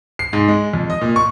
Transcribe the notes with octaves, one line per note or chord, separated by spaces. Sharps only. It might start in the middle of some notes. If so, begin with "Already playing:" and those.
C7
G#2
G#3
F2
D#5
A#2
C#6